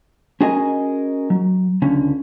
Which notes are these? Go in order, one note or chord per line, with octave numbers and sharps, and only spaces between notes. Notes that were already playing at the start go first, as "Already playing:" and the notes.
C#4 F#4 G#4 A#4 D#5 G#5
F#3
C#2 D3 C#4